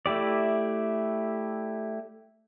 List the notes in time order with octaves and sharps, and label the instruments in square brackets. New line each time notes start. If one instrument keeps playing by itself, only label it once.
[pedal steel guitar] A3 E4 G4 D5